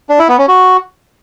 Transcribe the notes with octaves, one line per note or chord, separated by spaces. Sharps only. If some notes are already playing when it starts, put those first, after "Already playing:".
D4
E4
B3
C#4
F#4